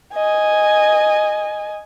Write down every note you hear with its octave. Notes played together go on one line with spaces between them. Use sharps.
D#5 G#5